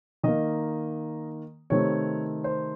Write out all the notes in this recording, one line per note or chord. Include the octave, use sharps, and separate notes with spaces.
D#3 A#3 D#5
C3 D#3 A3 C4 C#5
C5